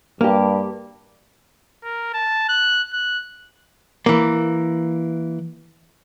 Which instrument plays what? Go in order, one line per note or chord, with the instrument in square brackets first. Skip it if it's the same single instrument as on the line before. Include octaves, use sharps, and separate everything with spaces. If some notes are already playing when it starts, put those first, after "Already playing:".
[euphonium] G2 [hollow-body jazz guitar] A#3 G4
[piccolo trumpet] A#4
A5
F#6
F#6
[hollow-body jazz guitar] E3 A#3